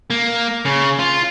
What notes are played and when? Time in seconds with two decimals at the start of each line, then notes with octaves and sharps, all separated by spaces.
0.10 A#3
0.65 C#3
0.99 F4